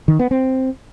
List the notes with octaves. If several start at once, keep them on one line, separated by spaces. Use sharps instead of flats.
D#3
B3
C4